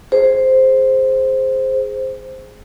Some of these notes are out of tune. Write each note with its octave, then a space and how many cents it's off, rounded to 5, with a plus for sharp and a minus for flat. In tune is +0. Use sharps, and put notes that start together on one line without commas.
G#4 +0 C5 +0